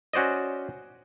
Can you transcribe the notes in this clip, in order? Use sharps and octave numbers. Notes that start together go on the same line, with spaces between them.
C#4 F#4 C5 D5 D#5